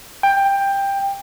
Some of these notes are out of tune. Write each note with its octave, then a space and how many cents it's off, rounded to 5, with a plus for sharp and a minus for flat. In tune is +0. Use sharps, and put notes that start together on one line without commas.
G5 +15